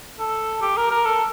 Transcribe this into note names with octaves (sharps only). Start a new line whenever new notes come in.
A4
G4
A#4
A#4
A4